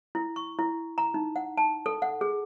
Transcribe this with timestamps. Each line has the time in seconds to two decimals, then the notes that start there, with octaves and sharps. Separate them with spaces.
0.15 E4
0.36 C#6
0.59 E4
0.98 A#5
1.14 D#4
1.36 F#5
1.57 A5
1.86 A4
2.02 F#5
2.21 G#4